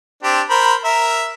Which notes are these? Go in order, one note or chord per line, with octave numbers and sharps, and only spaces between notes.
C4 D4 G4
A#4 C5 B5
A#4 E5